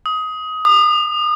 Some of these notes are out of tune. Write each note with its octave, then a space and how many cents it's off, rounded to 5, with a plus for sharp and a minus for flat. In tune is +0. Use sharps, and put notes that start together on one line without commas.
D#6 +20
D#6 -40